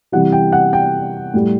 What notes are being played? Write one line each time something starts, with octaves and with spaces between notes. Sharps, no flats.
C3 E3 G3 F#5
G5
F#5
G5
A2 G3